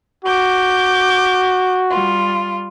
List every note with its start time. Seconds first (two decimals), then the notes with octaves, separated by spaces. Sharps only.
0.24 F#4 D6 G6
1.89 G3 F4